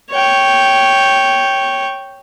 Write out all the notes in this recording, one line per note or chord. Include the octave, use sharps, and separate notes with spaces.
C#5 G5